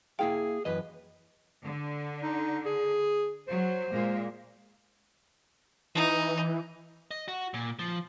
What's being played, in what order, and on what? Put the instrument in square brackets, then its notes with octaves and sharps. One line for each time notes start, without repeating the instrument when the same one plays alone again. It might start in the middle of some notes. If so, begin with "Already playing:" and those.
[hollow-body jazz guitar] A#3 E4 F5 [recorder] G#4 [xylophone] G5
[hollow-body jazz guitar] F#2 E3 D#5 [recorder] B4
[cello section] D3
[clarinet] D#4
G#4
[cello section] F#3 [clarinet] C5
[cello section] A#2 G#3 A#3
[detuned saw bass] E3 [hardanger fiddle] D#4
[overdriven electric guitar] D#5
F#4
A#2
F3